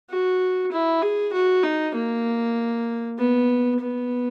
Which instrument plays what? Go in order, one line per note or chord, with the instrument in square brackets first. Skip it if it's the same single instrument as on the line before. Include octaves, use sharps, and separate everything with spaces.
[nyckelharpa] F#4
E4
G#4
F#4
D#4
A#3
B3
B3